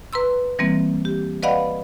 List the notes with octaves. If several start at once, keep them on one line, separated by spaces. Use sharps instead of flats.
B4 A#5 C6 E6
E3 G3 A#3 C4
G4
B4 D5 D#5 F5 F#5 B5